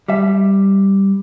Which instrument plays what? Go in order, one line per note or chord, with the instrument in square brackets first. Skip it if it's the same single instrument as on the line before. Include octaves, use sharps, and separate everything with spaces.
[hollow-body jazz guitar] G3 E5